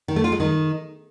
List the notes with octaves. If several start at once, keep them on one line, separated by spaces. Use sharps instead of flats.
D#3
A3
F4
G#3
D#3